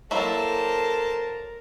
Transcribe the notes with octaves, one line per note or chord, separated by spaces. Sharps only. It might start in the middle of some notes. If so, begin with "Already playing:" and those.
F#3 A#3 E4 A4 A#4 C5 A5